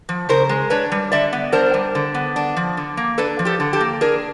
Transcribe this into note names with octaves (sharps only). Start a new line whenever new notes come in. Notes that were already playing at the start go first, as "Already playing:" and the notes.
F3
C#3 A#4 C5
G#3
D4 B4 C#5
G3
D3 D5 E5
B3
D4 A#4 C5
G3
D3
B3
D4
F3
D3
A#3
D4 A4 B4
F3
G4 A4
D3
G4 A4
A#3
D4 G#4 A#4